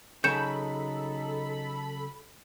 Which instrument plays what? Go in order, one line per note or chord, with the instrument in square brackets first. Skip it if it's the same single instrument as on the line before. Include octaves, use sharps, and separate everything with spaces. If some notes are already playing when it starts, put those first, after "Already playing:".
[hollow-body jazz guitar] C#3 F#3 [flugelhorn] D#4 [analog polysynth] A4 B5 [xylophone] G6 C#7 E7